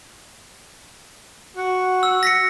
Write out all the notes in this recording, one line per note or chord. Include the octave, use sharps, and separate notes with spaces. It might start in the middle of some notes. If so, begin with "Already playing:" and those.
F#4
E6
A#6 B6 C#7